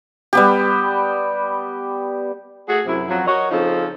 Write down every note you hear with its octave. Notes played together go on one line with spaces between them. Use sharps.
G3 B3 G4
A3 F#4 G#4
F#2 C3 F#3 E4
F2 F3 F#3
F#4 A#4 C#5 D#5
C#3 F3 C4 D#4 A4